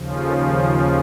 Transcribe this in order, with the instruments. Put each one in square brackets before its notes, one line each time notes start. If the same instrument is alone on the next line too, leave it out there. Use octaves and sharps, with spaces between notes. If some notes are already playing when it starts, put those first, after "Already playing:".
Already playing: [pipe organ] D#2 C#3 F3
A4
C5